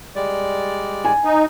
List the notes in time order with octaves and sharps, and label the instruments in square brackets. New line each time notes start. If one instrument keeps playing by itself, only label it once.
[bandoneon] G3 G#3 D5
[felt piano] G#5
[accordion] D#4